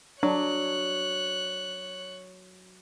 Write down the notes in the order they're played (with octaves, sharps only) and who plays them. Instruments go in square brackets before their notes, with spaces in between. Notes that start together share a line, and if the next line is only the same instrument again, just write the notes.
[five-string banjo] F#3 [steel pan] D4 [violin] C#5 F#6